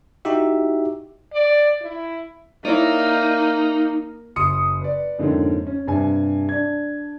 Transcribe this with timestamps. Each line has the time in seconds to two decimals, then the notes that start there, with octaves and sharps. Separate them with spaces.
0.25 D#4 E4 F#4 G4 E5
1.33 D5
1.82 E4
2.65 A#3 D#4 E4 C#5 D5
4.36 F#1 C6 D#6 C#7
4.81 B4 D5
5.19 F2 G#2 D3 A#3 C4 C#4
5.67 C#4
5.87 G2 C3 G#5
6.49 D4 G#6